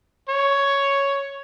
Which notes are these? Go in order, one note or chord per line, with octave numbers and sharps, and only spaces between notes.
C#5